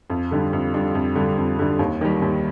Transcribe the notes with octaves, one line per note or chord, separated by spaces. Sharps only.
F2
D3 G3 D4
F2
D3 G3 D4
F2
D3 G3 D4
F2
D3 G3 D4
D#2
D#3 G3
D#2